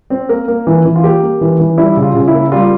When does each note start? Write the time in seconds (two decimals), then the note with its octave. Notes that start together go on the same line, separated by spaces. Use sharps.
0.10 C4
0.29 A#3 A#4
0.48 A#3
0.67 E3
0.85 E3
0.96 F4
1.04 A#3 G4
1.23 A#3
1.41 E3
1.60 E3
1.78 G3 E4
1.97 C#3
2.02 F4
2.14 C#3
2.28 E4
2.34 A#3
2.52 G3 F4